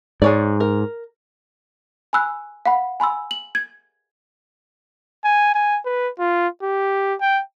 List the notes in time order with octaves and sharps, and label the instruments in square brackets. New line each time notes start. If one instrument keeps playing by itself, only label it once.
[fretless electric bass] G#2 [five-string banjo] G#3 C#5 D5
[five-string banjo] A#4
[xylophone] G#5 B5 E6 F#6
F5 F#5 B5
G#5 B5 C6 E6
F#7
G#6
[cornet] G#5
G#5
B4
F4
G4
G5